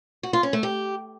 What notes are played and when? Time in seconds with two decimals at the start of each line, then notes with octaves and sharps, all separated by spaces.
0.23 F#4
0.33 F4
0.43 C#4
0.53 A3
0.63 G4